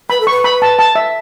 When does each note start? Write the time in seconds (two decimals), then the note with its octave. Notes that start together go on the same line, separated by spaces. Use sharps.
0.10 B4 B5
0.20 A4
0.27 C#6
0.30 B4
0.44 B5
0.62 A5
0.79 A5
0.95 E5